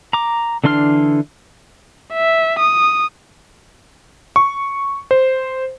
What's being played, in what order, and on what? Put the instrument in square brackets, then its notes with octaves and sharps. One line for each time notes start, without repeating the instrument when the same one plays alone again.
[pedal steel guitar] A#5 D6
D3 E3 D4 C6 F6
[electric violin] E5
D#6
[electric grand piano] C#6
C5